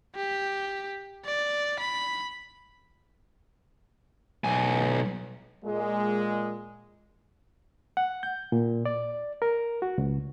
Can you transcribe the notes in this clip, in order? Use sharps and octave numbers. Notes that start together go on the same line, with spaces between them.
G4
D5
B5
B1 G#5
A#2 G#3
F#5
G6
A#2
D5
A#4
F#4
C#2